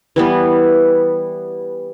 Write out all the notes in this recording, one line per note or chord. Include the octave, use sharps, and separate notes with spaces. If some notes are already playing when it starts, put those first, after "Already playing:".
E3 G3 B3